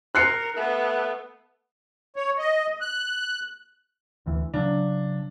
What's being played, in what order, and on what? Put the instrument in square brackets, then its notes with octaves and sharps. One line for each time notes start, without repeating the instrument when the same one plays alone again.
[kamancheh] A#4 [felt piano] F#6 C7 C#7
[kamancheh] A3 B3
[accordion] C#5
D#5
F#6
[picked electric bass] D#1 D2 E3
[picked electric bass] C#3 F#3 [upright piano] D4